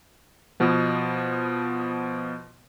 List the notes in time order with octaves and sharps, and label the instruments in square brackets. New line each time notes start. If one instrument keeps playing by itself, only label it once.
[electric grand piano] B2 F3 B3